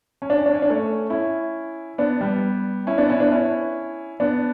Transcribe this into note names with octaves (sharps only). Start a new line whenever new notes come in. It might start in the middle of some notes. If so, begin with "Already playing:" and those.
C#4
D4
C#4
D4
C#4
D4
A3 C#4
C#4 E4
B3 D4
G3 B3
C#4 E4
B3 D4
C#4 E4
B3 D4
C#4 E4
B3 D4